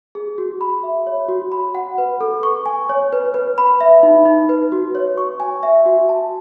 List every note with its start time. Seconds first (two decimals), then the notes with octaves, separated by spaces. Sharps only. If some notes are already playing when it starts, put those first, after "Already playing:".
0.15 G#4
0.38 F#4
0.61 B5
0.83 E5
1.07 C#5
1.29 F#4
1.52 B5
1.75 F#5
1.98 B4
2.21 A4
2.43 C#6
2.66 G#5
2.89 C#5
3.12 B4
3.34 B4
3.58 B5
3.81 E5
4.03 D#4
4.26 D#4
4.49 B4
4.72 F#4
4.95 C#5
5.18 C#6
5.40 G#5
5.63 E5
5.85 F#4
6.09 A5